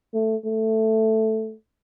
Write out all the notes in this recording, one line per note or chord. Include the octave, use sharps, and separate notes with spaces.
A3
A3